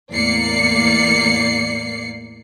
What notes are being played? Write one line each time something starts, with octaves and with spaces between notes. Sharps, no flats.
E2 A2 A#3 D5 C7 C#7